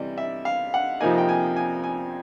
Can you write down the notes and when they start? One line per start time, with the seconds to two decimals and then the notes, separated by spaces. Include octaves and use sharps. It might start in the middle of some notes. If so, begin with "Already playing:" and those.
Already playing: C3 E3 G3 D5 D#5
0.18 E5
0.45 F5
0.74 F#5
1.00 F2 C3 F3 A#3 D#4 G#5
1.18 G5
1.29 G#5
1.56 G#5
1.84 G#5